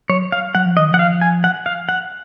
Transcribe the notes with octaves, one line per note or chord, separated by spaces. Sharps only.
F#3 C#5
F5
F#3 F#5
F3
D#3 D#5
F3 F#5
F5
G#5
F#5
F5
F#5